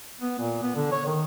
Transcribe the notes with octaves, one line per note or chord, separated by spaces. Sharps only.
B3
A#2
B3
D3
C#5
D#3